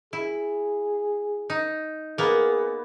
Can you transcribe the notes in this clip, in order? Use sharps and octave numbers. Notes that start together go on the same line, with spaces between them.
E4 G#4
D#4
A#3 B3 G#4